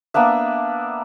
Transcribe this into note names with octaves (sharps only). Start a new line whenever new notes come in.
A#3 B3 D4 E5